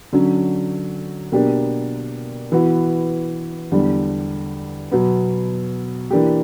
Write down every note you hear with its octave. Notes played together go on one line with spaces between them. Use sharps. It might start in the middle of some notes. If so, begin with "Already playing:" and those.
D3 F#3 C#4
B2 A#3 D4 G4
E3 B3 F#4
E2 D3 G3
B2 F#3 B3
E3 A#3 D4 G4